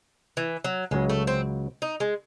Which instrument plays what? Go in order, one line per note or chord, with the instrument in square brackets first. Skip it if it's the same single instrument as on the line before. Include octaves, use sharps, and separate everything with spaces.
[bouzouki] E3
F#3
[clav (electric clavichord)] C#2 C#3 F#3 [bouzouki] G#3
[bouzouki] A3
C4
D#4
G#3